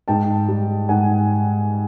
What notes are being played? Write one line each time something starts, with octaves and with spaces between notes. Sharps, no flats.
G#2 G5 A5
G3
G#2 F#5 G#5